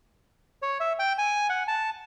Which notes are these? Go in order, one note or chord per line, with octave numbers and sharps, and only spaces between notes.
C#5
E5
G5
G#5
F#5
A5